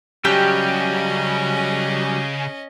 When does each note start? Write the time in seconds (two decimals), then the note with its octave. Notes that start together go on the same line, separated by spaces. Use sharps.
0.25 C#3 F#3 G3 C#4 G4 D#5